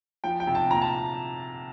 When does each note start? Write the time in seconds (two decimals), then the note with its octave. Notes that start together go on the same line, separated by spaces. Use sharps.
0.24 F3 G5
0.40 G5
0.47 C3
0.55 A5
0.70 A#2 A#5
0.82 A5